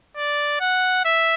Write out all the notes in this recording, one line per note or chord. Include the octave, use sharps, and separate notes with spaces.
D5
F#5
E5